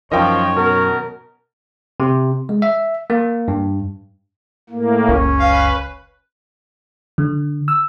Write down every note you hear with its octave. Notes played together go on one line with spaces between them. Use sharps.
F#2 D#3 F3 C#5 D#5 G5 A5
B2 A#4
C3
G#3
E5
A#3
G2
A2 A#3
F#1 C#2 C#3 C#4
B4 F5
D3
E6